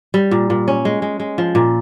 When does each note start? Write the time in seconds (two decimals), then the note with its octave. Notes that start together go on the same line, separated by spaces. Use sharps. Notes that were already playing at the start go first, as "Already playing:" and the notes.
0.14 G3
0.31 A#2
0.50 A#2
0.68 C#4
0.85 G#3
1.02 G#3
1.20 G#3
1.38 F3
1.55 A#2